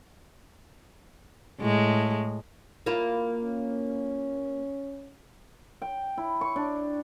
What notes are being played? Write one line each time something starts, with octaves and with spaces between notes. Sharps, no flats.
A2 G#3
A#3 E4 F4
C#4
G5
E4
C#6
D4